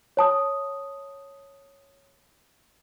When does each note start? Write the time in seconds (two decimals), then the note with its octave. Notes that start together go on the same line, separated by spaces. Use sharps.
0.17 C#5 A5 D#6